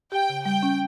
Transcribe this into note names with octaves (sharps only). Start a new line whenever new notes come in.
G4 G5
C#3
G3 G5
C#4